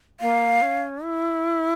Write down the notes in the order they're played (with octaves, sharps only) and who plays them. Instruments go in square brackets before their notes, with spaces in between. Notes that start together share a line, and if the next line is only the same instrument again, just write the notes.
[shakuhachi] A#3 [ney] F5
[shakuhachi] C#4
E4